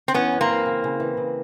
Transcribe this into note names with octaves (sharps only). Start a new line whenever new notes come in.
C4
E3 B3 C#4
F#2
A#3 C4
E3
C#3
C#3
E3
C#3